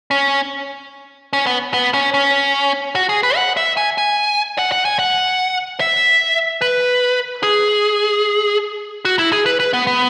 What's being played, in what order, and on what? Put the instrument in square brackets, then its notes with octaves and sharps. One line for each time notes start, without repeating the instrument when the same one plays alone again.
[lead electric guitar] C#4
C#4
B3
B3
C#4
C#4
F#4
G#4
B4
F#5
E5
G#5
G#5
F#5
F#5
G#5
F#5
E5
B4
G#4
F#4
E4
G#4
B4
B4
B3
B3